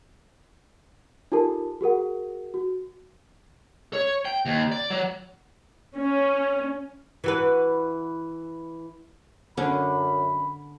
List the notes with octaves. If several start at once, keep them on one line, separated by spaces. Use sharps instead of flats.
D#4 F4 G4 A4 A#4 A5
F#4 G#4 A#4 F#5
F#4
C#5
G5
D#2
D5
F#3
C#4
E3 F#4 B4
F#2 D3 C#4 D4 B5